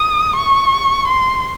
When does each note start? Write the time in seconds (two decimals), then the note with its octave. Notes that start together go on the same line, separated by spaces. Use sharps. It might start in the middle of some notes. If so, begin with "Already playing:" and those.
Already playing: D#6
0.36 C#6
1.08 C6